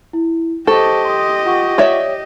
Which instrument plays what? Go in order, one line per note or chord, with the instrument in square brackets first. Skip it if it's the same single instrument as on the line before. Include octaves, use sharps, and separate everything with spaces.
[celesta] E4
[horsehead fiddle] G4 D#5 [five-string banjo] A4 [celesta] C5 A5 C#6
[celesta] C6 D#6
F4 F#5 C#6
[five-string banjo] C#5 D5 E5